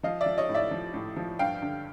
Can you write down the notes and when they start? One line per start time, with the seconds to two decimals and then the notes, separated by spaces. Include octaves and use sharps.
0.03 F3 D#5 F5
0.21 D5 E5
0.26 F3
0.38 C#5 D#5
0.49 A2
0.54 D5 E5
0.71 F3
0.94 A2
1.16 F3
1.39 G2 F5 G5
1.62 D3